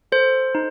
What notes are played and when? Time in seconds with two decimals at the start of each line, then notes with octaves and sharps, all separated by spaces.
0.12 A4 C5
0.55 D#4